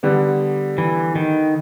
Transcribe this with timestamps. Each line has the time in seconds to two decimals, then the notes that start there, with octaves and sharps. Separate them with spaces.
0.03 D3 G3 B3
0.78 E3
1.16 D#3